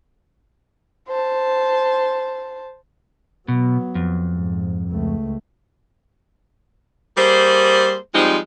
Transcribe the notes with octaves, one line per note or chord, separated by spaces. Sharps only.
C5 A5
B2 F#3 B3
F2
G#2
C#2 A3
G3 A#3 G#4 C5
F3 G3 G#3 C4 D#4